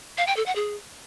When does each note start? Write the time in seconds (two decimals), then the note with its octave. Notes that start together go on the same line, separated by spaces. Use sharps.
0.18 F5
0.27 G5
0.37 A4
0.46 F#5
0.56 G#4